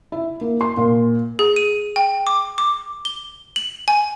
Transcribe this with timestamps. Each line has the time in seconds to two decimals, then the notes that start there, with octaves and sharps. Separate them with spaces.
0.12 E4
0.41 A#3
0.61 C6
0.77 A#2
1.39 G#4
1.56 D#7
1.96 G5
2.27 D6
2.58 D6
3.05 G7
3.56 F#7
3.88 G#5